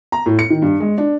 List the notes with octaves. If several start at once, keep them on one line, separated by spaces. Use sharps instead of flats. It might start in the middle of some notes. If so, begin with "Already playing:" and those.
A#5
A2
C#7
D#3
G2
G#3
D4